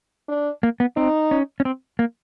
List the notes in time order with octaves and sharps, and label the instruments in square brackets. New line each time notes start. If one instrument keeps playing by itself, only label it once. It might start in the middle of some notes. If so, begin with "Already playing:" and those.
[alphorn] D4
[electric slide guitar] A#3
B3
[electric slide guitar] C4 [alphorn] D#4
[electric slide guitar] C#4
C#4
C4
A#3